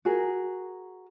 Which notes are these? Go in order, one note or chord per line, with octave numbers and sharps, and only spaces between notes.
F#4 G#4 A#4